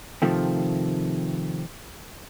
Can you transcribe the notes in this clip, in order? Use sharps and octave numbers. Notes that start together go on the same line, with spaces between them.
C3 D#3 F3 A3 C4